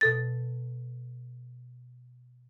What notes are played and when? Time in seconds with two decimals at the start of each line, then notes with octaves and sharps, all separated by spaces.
0.01 B2 A4 A6